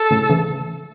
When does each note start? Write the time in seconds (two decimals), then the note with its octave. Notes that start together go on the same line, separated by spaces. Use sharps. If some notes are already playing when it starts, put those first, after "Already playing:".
Already playing: A4
0.11 A2 C#3
0.30 C#3 E3